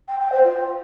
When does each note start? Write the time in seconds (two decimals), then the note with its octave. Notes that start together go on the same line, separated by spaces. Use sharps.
0.08 G5
0.20 G5
0.32 C5
0.43 F4